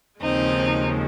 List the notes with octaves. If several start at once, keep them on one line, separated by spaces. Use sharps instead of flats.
D#2 C#3 F3 G#3 C4 D#4